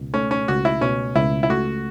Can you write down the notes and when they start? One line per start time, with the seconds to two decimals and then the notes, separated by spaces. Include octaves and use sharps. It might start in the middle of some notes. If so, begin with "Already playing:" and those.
Already playing: C#2 B2
0.14 A3 C#4
0.31 C#4
0.48 C#2 F#4
0.65 E4
0.81 B2 C#4
1.16 C#2 E4
1.43 E4
1.49 A3 F#4